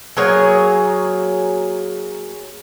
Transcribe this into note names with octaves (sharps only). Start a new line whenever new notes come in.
F#3 A#3 G#4 C#5